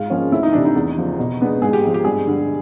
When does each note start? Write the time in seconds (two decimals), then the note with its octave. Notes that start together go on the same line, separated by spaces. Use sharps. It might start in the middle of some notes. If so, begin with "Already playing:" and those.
Already playing: G#2 F4
0.10 F3 A#3 C#4
0.32 D2 E4
0.43 D#4
0.53 C3 E3 D4
0.65 D#4
0.76 E2
0.97 C#3 F3
1.19 B2
1.41 G#3 B3 D4
1.62 G#2 G#4
1.73 G4
1.84 F3 G#3
1.94 G4
2.05 G2 G#4
2.27 D3 G3